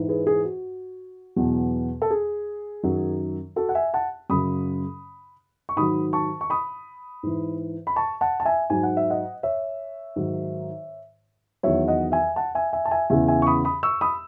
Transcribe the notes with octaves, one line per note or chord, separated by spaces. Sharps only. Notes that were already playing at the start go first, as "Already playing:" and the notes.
Already playing: G#2 E3
G#4 B4
G#4
F#4
E2 B2 F#3
A4
G#4
F#2 D#3 F#3
F#4 A4
F#5
E5 G#5
F#5 A5
F#2 C#3 F#3 B5 D#6
C#6
G#2 D#3 F#3 B5 D#6
A5 C#6
C#6
B5 D#6
G#2 E3
B5
A5 C#6
F#5 A5
A5
E5 G#5
G#2 F#3 G#5
F#5
E5
D#5 F#5
C#5 E5
G#2 D#3 F#3
E2 D#3 F#3 C#5 E5
D#5 F#5
E5 G#5
F#5 A5
E5 G#5
E5 G#5
A5
E5 G#5
E2 C#3 E3 E5 G#5
E5 G#5
C#6
B5 D#6
B5 D#6
C#6 E6
B5 D#6